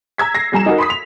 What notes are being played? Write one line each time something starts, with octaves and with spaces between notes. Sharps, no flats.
A#5 E6 G#6 B6
A#6 C7
F2 G3 G#5 A#5 E7
D#4 F#4 A#4
B5 C6 D#6 B6
F7